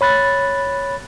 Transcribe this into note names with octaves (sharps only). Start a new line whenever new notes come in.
C#5 B5 F#6 A6